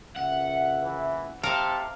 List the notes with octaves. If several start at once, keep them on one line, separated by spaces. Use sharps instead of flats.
C#2 A#3 E5 F#5
E3
C3 A4 A#4 F5